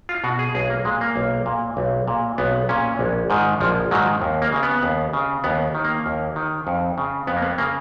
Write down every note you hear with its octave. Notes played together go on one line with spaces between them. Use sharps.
F4
B2 F#4
G#4
B1 G#4
A#3
A#2 G#3
A#3
B1
A#2
B1
A#2
B1 B3
A#2 C#4
A#1
G#2 D#3
A#1 F3
G#2 D#3 F#3
D#2
A#3
C#3
B3
D#2
C#3
D#2 B3
D#3
A#3
D#2
D#3
F2
C#3
F2 B3
A#3
B3
C#3 A#3